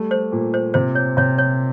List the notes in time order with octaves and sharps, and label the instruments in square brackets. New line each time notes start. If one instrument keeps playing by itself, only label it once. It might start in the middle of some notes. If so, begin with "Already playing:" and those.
Already playing: [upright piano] G3 A3
[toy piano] C5
[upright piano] A#2
[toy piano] C5
[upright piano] C3 [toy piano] C5
[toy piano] C#5
[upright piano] C3 [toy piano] C#5
[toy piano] C#5